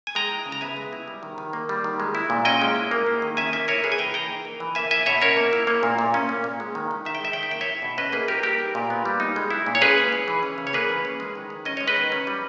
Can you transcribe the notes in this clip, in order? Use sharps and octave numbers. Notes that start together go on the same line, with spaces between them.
G#5
G#3 G5 A#5
E4
C#3
A#5
B3 E5 G#5
G#3
E4
G3
D#3
D#3
A#3
G3
D#3
G#3
E4
A#2
C#4 D#5 G5
G#3
E4
A#3
E4
D#3
C#4 E5 G#5
A#3 E5 G#5
E4 A#4 C#5
A#3 G#4 B4
G#5
E3 G5 A#5
E3 G5 A#5
D#4
A#3
E3
A#3 E5 G#5
E4 E5 G#5
B2 C#5 E5
C#4 A#4 C#5
A#3
E4
A#3
A#2
A#2
C#4
A#3
A#2
G#3
D#3
D#3
D#4 E5
G5
G#3 E5
D#3 G5
E5
A#3 G5
C#5 E5
E4
B2
C#4 B4 D#5
A#3 G#4 B4
E4 G4 A#4
G3 G4 A#4
D#4
A#2
B3
G3
D#4
G#3
E4
A#2
C#5
C#4 G#4 B4
G#3
E4
E3
C#4
C#3
C#5
A#3 G#4 B4
E3
C#4
G#3
D#3
D#3
C#4 D#5
G#3 C#5
B4 D#5
D#3
C#4
G3